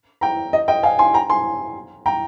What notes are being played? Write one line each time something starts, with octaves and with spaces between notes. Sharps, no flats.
G5 A#5
D#5
D#5 G5
F5 G#5
G#5 C6
G5 A#5
G#5 C6
G5 A#5